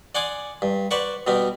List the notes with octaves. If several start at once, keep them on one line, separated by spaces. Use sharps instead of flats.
D5 F#5 G#5 C6 D6 D#6
G2
B4 C5 D5 F#5 C#6
B2 G3 B3 C4